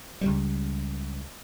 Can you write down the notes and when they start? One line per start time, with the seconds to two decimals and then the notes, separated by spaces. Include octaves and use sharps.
0.21 C#2 G3